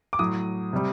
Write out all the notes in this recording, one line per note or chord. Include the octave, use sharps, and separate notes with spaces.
D6
A2 F#3 D#6
C3 G3